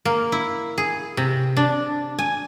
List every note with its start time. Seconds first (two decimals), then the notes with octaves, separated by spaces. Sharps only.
0.05 A#3
0.32 E4
0.78 G#4
1.17 C3
1.57 D4
2.19 G#5